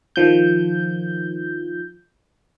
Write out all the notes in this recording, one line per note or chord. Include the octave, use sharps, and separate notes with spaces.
D#3 F3 G6